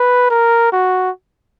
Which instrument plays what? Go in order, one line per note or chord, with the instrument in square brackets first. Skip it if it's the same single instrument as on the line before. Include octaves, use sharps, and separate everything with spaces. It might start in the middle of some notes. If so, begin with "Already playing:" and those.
Already playing: [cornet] B4
A#4
F#4